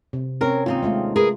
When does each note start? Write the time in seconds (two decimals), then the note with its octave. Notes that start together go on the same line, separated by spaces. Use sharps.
0.13 C3
0.41 C4 C#4 A#4 C#5
0.66 D#2 C4 D#4 F4
0.82 G#3 A3 F4
1.16 G#4 A#4 B4